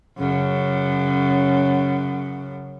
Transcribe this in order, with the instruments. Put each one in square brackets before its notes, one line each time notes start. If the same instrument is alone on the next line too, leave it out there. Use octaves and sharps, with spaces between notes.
[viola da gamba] F#2 C#3